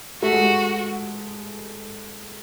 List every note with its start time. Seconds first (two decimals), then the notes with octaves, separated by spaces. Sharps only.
0.22 A3 F#4
0.33 G#3
0.44 A3